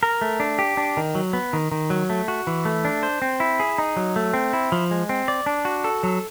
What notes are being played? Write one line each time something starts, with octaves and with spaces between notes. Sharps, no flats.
A#4
A3
D4
G4
D4
D#3
F#3
B3
D#3
D#3
F#3
A3
F#4
E3
A3
D4
C5
C4
E4
G#4
D#4
F#3
A3
C4
E4
F3
G#3
C4
D5
D4
F#4
A4
F#3